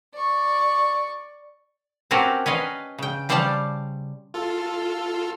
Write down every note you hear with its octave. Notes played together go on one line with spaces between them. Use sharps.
D5 C#6
C4 C#4 F#4 G4 A4 A#4
C#4 B4 D#5 F5
C#3 G5
C#3 G3 C5 D5 F5 A5
F4 A4